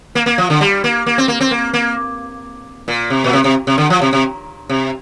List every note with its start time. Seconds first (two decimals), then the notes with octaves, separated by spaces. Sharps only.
0.15 A#3
0.26 A#3
0.38 F3
0.50 D3
0.61 G3
0.84 A#3
1.06 A#3
1.18 C4
1.28 A#3
1.40 C4
1.51 A#3
1.74 A#3
2.88 A#2
3.10 C3
3.24 A#2
3.33 C3
3.44 C3
3.67 C3
3.78 D3
3.90 F3
4.02 C3
4.13 C3
4.69 C3